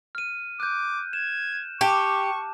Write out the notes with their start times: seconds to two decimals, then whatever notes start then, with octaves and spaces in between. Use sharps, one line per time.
0.15 F6 D#7
0.60 D6 F#6 G6
1.13 G#6 E7
1.81 G4 A5 C#6 D6